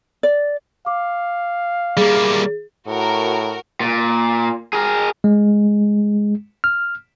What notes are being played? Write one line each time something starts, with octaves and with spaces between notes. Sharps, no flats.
D5
F5 D6
G3 A#3 G#4
A2 F#4 A#4
A#2
G#4 A#4
G#3
F6